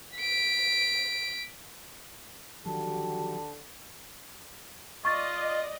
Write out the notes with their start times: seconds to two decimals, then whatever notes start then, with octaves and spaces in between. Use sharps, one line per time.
0.18 B6 D7
2.66 D3 D#3 F3 F#3 F#4 G4 A5
5.05 F4 D5 D#5 C#6 A6